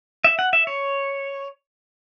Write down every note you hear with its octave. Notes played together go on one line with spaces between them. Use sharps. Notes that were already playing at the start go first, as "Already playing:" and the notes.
E5
F#5
E5
C#5